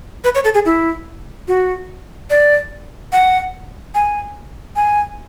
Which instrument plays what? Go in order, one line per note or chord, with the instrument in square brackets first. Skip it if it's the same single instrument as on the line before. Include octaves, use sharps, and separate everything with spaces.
[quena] B4
C#5
A4
G#4
E4
F#4
D5
F#5
G#5
G#5